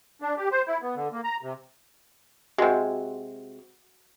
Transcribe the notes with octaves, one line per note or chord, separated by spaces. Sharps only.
D4
G4
C5
E4
B3
D3
A#3
A#5
C3
C3 G#3 F#4 F#5